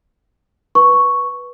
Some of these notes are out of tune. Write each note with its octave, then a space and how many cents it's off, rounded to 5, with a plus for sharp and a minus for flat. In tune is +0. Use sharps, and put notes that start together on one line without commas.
B4 -10 C#6 +0